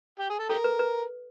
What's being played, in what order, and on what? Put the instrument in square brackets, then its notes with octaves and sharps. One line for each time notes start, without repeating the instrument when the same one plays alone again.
[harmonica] G4
G#4
A4
[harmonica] G4 A#4 [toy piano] A4
[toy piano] B4
B4